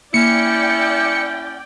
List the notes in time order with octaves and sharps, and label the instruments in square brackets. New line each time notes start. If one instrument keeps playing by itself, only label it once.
[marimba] A#3 [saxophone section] C#4 E4 [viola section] D5 G5 [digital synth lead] C#7